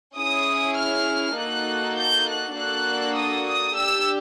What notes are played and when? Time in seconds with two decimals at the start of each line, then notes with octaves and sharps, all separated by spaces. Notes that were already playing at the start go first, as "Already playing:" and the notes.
0.16 C#4 E4 G#4 D#6
0.76 F6
1.37 A#3 D#4 F#4 A4 F#6
1.96 G6
2.27 F#6
2.55 A#3 D4 F#4 A4 F#6
3.15 D#6
3.45 D#6
3.75 D4 G4 E6